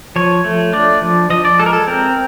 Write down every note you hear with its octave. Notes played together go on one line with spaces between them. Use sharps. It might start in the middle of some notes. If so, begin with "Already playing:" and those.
F3 C#5
A3
D4 D5
F3
F3 D#5
D5
G#3 A4
A#4
A4
C4 A#4